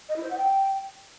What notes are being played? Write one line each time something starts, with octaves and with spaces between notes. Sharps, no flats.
D#5
E4
C5
F#5
G5